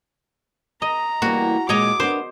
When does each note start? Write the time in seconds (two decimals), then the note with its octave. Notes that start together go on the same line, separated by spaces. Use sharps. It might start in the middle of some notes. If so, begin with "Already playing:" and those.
0.82 D#5 A#5
1.22 E2 G3 A#3 F#4
1.69 A#2 G#3 C#5 D#5 A#5 D6
2.00 B3 D4 A#4 C5